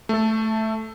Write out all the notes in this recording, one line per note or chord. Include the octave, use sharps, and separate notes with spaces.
A3 A4